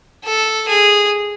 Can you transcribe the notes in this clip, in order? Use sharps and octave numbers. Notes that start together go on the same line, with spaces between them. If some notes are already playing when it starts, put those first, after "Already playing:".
A4
G#4